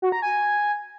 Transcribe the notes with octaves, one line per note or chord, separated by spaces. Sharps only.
F#4
A#5
G#5